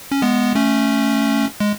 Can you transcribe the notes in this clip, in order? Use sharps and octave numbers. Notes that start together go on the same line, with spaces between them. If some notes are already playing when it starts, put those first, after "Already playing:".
C#4
G#3 B3
A3 C#4
G#3